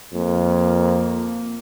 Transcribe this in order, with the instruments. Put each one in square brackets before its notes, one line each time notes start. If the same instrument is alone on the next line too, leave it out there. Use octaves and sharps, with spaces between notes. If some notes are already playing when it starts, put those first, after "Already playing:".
[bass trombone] F2 [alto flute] A#3